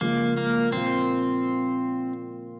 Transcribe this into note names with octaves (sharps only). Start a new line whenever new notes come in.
C#3 F3 G#3 A#3
A#3
A#2 F3 A#3 C4 F4